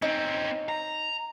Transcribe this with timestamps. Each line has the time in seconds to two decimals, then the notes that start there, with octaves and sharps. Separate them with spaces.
0.02 C4 C#4 D#4
0.69 A#5